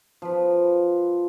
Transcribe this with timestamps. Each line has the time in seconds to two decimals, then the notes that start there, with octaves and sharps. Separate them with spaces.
0.22 F3 B4